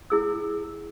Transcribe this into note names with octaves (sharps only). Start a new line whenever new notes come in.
E4 G#4 E6